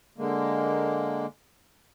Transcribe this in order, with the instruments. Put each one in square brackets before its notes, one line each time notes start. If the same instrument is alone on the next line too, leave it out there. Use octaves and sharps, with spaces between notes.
[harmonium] D3 G#3 A#3